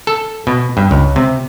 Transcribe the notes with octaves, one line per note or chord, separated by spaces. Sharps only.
A4
B2
G2
C#2
C3